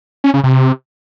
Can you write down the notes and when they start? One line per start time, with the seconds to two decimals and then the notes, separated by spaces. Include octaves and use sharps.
0.24 C#4
0.34 C#3
0.44 C3